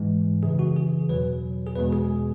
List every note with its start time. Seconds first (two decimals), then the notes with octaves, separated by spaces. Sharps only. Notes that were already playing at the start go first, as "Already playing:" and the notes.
Already playing: G#2 E3 G#3
0.43 F#2 C#3 E3 G#4
0.59 F#4
0.76 G#4
1.09 E2 B2 F#3 B4
1.66 G#4
1.75 E2 B2 G#3 B4
1.93 G#4